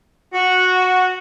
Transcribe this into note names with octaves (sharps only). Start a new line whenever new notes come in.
F#4